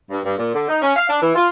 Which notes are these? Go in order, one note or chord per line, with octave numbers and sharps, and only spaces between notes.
G2
G2
A#2
D3
D#4
C#4
F5
D4
E3
F4